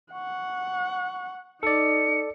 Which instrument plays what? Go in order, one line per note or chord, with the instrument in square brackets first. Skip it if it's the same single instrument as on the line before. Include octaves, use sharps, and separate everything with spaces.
[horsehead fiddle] F#5 [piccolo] C#6
[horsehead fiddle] D#4 [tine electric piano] A4 D5 [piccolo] C#7